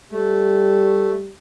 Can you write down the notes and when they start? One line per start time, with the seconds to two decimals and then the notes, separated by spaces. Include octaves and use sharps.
0.12 G3 A3